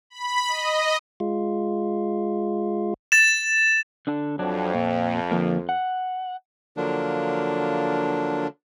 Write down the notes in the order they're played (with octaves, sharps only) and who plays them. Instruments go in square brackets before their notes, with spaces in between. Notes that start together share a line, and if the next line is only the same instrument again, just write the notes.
[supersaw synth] B5
D#5
[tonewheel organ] G#3 F4
[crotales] A6 E7
[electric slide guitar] D3 D4 A4
[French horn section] F2 [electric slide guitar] F#3 D4
[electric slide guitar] A#2
D3 F3 A#3
F#5
[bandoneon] D3 F3 F#3 A#3 D4